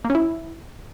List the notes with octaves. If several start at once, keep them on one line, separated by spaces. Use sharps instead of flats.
A#3
C#4
E4